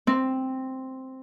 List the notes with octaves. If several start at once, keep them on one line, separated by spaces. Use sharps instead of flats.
C4